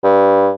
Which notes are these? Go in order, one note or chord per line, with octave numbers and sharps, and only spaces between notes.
G2